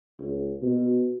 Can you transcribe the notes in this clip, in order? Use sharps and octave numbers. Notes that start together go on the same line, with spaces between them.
C#2
B2